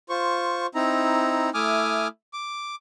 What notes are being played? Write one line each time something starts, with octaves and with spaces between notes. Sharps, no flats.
F4 C5 C#6
C4 D#4 E4 A#5
A3 E4 G#5 D6 D#6 F6
D6